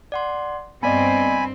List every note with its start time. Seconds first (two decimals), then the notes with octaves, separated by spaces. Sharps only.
0.12 D5 F#5 C6
0.83 G2 B3 C4 D5 D#5 G#5 B5